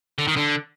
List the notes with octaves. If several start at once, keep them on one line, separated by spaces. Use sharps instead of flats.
D3
D#3
D3